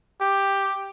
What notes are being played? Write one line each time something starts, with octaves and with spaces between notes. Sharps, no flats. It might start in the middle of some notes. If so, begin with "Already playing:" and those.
G4